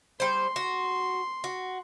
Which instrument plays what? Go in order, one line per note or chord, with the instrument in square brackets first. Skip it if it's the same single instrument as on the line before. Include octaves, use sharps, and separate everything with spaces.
[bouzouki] G3 C5 [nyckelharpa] C6
[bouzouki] F#4
F#4